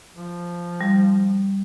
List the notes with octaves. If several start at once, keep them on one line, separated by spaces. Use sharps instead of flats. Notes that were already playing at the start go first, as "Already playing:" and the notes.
F3
G3